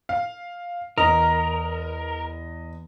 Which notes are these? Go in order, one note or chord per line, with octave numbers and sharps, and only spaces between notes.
F5
E2 A#4 D#5